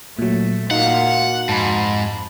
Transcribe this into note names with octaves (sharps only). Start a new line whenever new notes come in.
A#2 F#3 A3
A#2 D#4 F#4 F5 F#5
F2 G#2 A5 B5